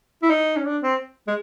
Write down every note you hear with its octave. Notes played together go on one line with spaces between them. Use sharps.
E4
D#4
C#4
D4
C4
G#3